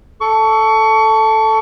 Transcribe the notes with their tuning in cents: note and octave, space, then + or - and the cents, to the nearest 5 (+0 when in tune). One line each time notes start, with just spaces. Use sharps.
A4 +0 C#6 +25